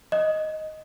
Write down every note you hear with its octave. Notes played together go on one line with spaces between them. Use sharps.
D#5